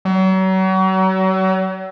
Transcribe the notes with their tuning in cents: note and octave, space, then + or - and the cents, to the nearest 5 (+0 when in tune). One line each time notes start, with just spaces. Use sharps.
F#3 +35